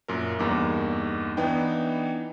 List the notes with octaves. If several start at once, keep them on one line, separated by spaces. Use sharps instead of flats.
F#2 A#2 A#4
E2 G2 A#3 D#4 D6
E3 B3 D4 D#4 G5